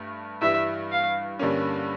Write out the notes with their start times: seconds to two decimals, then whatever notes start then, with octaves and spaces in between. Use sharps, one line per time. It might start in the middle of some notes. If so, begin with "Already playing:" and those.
Already playing: G2 A3
0.42 G2 E3 G3 E5
0.92 F5
1.39 G2 D3 G3 A#3 C#4